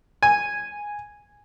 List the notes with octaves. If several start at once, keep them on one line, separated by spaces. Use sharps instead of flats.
G#5